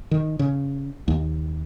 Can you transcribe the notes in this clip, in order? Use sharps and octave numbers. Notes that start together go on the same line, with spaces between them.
D#3
C#3
D#2